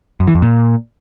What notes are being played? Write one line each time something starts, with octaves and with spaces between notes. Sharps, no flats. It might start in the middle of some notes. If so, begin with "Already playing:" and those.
F#2
E3
F2
A#2